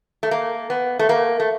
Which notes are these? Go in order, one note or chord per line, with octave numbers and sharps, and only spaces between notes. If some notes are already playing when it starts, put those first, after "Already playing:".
A3
A#3
B3
A3
A#3
A3